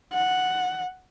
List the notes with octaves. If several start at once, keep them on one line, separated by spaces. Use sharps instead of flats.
F#5